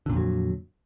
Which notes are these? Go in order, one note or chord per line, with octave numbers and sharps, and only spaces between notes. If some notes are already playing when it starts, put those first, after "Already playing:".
F2 A#2 D3 F#3